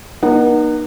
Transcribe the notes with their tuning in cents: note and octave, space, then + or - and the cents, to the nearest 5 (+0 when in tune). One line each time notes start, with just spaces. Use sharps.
A#3 +45 D#4 -30 F#5 +0